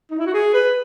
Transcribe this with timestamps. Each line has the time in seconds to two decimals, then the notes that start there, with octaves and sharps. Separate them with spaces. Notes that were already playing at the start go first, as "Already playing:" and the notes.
0.11 D#4
0.19 E4
0.26 F#4
0.34 G#4
0.54 B4